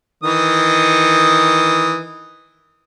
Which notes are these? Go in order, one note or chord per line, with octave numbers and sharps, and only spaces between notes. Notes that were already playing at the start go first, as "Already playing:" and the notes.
D#3 E3 D#6